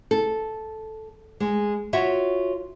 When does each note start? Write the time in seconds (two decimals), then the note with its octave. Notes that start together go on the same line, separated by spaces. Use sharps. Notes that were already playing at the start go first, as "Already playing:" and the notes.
0.11 A4
1.40 G#3
1.93 F4 F#4 C#5 E5